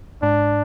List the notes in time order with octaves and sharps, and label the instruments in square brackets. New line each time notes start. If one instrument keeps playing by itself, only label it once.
[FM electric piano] G#2 [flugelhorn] D4